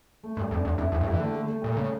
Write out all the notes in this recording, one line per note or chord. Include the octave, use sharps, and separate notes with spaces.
A3
G2
G3
F2
E2 D4
F2 E4
E2 A4
G2
F2 G4
E3
D3 A3
A3
A3
A#2 G3
C#3 A3